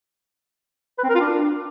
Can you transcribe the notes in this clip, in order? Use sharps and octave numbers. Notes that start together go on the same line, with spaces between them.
B4
C4
A#4
F4
D4